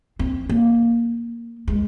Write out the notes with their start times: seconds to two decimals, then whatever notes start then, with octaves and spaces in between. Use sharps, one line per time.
0.19 C4
0.49 A#3
1.68 G#3